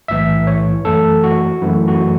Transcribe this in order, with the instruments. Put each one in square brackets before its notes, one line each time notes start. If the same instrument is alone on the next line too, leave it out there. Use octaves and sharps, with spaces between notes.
[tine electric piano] B1 A2 E3 E5
C#5
F#2 E3 A3 A4
F#4
F#2 E3 A3 E4
F#4